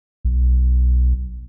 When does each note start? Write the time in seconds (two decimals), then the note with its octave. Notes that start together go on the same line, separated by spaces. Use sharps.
0.25 B1